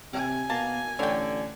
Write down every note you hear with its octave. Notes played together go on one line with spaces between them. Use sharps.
C3 G#5
B2 A#3 A5
A1 D3 C#5 G5